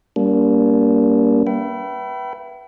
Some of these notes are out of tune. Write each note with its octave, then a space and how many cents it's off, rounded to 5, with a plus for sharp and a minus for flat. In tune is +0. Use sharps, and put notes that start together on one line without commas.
G3 +0 A#3 +10 D4 -40
B4 -10 E5 +30 G5 -40